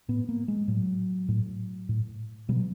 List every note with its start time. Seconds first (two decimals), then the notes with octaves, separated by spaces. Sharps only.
0.08 A2 B3
0.29 A#3
0.48 G#3
0.68 A2 F#3
1.29 A2
1.89 A2
2.49 B2 G3
2.56 F#3